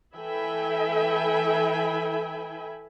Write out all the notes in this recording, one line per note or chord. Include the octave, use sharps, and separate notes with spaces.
E3 A4 E5 G5 G#5 B5